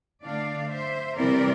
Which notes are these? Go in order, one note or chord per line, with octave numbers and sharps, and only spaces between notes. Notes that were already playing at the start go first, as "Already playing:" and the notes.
D3 A3 D4 D5 F5
C5 E5
C3 E3 G3 C4 E4 A#4 D5